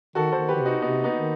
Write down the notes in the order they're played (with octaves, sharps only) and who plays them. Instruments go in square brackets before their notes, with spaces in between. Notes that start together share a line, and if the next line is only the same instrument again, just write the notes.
[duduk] D#3 [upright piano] F#4 A4
[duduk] D#3 [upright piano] A4 C5
[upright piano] G4 B4
[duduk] D#3
C3
[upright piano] D#4 F#4
[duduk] C3 [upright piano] B3 D#4
[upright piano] B3 D#4
[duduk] D#3